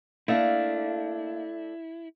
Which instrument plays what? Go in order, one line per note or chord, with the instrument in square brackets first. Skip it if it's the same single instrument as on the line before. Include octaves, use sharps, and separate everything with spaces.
[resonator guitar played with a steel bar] A3 D4 [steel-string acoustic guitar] A#3 D#5 F5 [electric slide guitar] E4